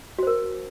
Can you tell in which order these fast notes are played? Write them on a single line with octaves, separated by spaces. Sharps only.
F#4 C5 A#4